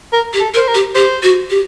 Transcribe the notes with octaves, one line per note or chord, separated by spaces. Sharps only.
A#4
G4
A4
A#4
C5
A#4
G4
G4 C5
F#4
G4